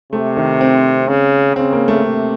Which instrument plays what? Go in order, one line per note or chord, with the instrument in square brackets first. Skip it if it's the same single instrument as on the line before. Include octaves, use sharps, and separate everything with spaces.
[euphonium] C3 [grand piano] A3
[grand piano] D#3
C4
[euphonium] C#3
[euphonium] C#3 [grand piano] C4
[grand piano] A#3
A3
[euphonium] C3